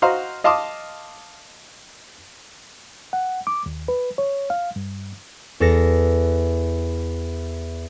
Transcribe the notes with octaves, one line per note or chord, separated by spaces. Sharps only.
F#4 C5 D#5 F5 A#5
D#5 F5 A5 C6 D6 D#6
F#5
D6
D#2
B4
C#5
F5
G2
E2 A4 A#6